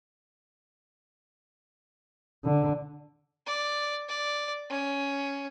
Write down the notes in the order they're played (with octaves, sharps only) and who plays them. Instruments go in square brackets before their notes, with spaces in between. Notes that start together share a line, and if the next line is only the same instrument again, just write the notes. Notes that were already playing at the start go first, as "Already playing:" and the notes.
[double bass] D3
[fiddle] D5
D5
C#4